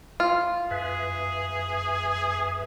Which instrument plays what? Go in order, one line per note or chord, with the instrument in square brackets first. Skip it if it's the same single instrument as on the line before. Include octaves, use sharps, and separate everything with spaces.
[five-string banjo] F4
[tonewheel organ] F#2 B4 E5 [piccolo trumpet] G#4